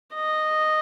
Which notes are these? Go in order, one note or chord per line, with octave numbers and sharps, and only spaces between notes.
D#5